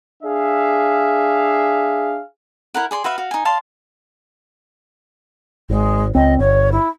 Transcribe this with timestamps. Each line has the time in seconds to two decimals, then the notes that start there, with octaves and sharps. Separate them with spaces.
0.23 D4 G#4 E5 F5
2.74 E4 A#4 F#5
2.91 G#4 D5 C6
3.04 F#4 B4 E5 F5
3.18 F#4 F5
3.31 D#4 G#5
3.45 D5 F5 A5 C6
5.70 G#1 G#3
6.15 C#2 C4 D#5
6.39 G1 C#5
6.72 E4